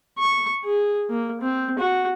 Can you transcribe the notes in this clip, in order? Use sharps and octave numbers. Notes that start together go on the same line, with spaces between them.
C#6
G#4
A#3
C4
F#4